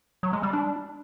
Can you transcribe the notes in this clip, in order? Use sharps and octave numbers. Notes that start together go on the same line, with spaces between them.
F#3
G#3
G3
D4